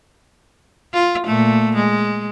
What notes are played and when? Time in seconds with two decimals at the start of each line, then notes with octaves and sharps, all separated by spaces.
0.93 F4
1.26 A#2 A3
1.76 G#3